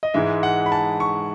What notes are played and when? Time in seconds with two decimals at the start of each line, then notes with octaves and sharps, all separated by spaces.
0.03 D#5
0.14 G#2 E3 G#3 E5
0.43 F#5
0.66 B5
0.72 A5
1.00 C#6